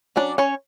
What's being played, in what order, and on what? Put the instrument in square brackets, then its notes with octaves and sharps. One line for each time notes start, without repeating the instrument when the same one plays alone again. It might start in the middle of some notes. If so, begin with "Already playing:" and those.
[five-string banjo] F#3 C#4 D4 D5
C#4 C#5